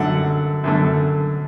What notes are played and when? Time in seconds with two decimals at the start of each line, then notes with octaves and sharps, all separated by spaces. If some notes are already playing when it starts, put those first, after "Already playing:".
Already playing: F#2 D3 A3 F#5
0.64 F#2 D3 A3